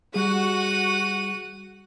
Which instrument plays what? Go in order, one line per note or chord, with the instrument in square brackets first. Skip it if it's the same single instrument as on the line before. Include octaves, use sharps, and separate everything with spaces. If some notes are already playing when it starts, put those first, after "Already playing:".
[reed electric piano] G3 G#4 [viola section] F#4 [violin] F#5 D#7